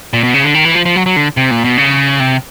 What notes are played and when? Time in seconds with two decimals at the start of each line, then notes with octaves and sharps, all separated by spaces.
0.13 A#2
0.23 B2
0.34 C#3
0.44 D3
0.54 D#3
0.65 E3
0.75 F3
0.86 F3
0.96 F#3
1.06 F#3
1.16 D3
1.37 C3
1.51 A#2
1.64 B2
1.78 C#3
2.20 C3